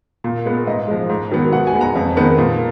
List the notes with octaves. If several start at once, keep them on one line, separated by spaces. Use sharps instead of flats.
A#2
G#3 B3
G#2 D#5
F3 G#3
G#2
D#3 F#3 B3
B2 F#5
G#5
G#3 B3
A#5
F2
D#3 G#3 B3
A#2